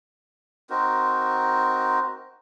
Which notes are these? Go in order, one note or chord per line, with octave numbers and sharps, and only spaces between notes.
C4 D#4 F#4 A#4